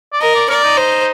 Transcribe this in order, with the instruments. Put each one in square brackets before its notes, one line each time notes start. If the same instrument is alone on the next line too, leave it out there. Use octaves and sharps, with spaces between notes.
[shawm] D5
[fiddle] A#4 [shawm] D#5
[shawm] D5
[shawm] A#4 [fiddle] D5
[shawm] D#4
[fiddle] C5